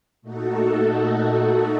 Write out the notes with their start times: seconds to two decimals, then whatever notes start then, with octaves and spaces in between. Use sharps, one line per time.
0.22 A#2 A3 D#4 F#4 A4